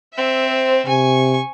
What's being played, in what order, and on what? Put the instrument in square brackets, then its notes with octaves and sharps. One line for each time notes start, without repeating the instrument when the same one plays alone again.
[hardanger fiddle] C4 E5
[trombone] C5
[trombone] C3 [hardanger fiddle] G#5 C#6